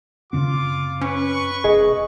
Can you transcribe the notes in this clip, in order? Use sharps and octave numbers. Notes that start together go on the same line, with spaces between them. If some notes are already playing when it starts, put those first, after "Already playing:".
F#2 C#3 C4 F4 D6
C#4 B4 C#6
F1 G#4 D#5